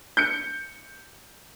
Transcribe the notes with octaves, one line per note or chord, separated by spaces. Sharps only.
G6 C#7